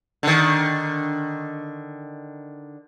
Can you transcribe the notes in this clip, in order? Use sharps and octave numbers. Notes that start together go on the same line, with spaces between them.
D3 D#3